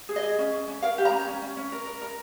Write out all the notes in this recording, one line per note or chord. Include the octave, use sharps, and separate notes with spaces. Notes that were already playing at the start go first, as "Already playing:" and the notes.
G#4
D#5
G#4
C#4
C#4
C#4
A#4 F5
G4
A#5
C#4
C#4
C#4
C#4
A#4
A#4
A#4